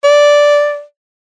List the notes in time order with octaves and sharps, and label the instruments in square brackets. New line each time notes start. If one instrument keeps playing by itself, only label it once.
[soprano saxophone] D5